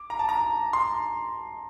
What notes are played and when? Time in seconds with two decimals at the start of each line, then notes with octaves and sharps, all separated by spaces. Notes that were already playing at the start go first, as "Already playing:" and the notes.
Already playing: D6
0.10 A#5
0.19 A5
0.29 A#5
0.73 C6